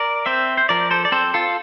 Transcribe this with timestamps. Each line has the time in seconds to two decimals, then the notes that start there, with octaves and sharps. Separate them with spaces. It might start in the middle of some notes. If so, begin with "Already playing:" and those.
Already playing: A#4 D5
0.26 C4 C5 E5
0.57 C5
0.69 F3 A#4 D5
0.91 A4 C5
1.05 D5
1.12 C4 A4 C5
1.34 F4 A4